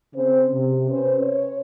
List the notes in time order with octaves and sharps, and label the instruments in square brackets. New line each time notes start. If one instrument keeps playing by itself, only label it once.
[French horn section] C#3 C4 C5
C3
C#4 B4 C5
C#5